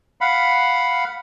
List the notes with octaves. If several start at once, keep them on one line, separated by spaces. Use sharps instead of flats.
F5 F#5 B5